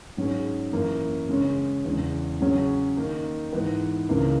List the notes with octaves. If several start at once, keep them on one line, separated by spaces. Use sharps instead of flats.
G#2 F#3 C#4 G#4
F#2 E3 A#3
C#3 G#3 C#4
E2 C#3 G#3
C#3 F#3 C#4 G#4
D#3 A#3 D#4
G#2 E3 B3
C#2 C#3 E3 A#3